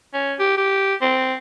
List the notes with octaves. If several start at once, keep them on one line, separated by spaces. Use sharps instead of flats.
C#4
G4
G4
C4